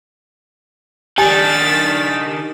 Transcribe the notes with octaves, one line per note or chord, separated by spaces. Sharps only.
D#3 D4 G4 G#5 A6 B6